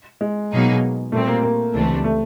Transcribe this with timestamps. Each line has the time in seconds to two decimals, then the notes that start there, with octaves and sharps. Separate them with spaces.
0.21 G#3
0.52 B2 F#3 A#3 D#4 G#4
1.12 A#2 G3 A3 C4
1.27 A#3
1.43 A#3
1.74 C#2 C3 E3 A3 D4
2.04 A3